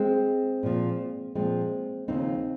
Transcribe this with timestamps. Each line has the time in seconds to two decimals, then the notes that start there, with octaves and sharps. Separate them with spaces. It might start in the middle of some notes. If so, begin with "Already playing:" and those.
Already playing: G#3 C4
0.63 A#2 F3
1.35 A#2 F3 G#3 C4
2.08 D#2 C#3 F3 C4 D#4